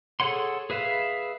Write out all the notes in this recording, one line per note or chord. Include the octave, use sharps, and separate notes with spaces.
G#4 A4 C#5 F#5 C6
G#4 B4 E5 F5